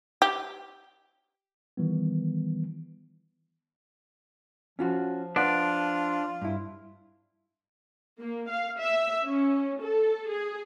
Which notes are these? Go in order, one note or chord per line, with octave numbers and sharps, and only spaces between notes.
G4
D#3 E3 G3 B3
F3 C#4 F4 F#4
D4 F4 B4 F#5
G2 E4
A#3
F5
E5
C#4
A4
G#4